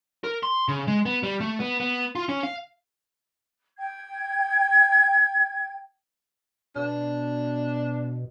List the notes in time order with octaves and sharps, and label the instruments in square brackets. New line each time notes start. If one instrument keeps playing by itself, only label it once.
[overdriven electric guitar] A#4
C6
C#3
G#3
B3
G3
A3
B3
B3
F4
C#4
F5
[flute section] G5 G#6
[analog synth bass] B2 [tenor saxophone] D4